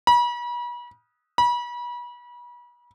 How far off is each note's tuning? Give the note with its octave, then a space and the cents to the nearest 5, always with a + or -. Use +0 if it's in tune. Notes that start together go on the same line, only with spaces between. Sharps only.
B5 -40
B5 -35